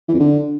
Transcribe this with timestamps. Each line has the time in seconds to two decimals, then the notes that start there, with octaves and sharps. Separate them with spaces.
0.08 E3
0.14 F2
0.20 D3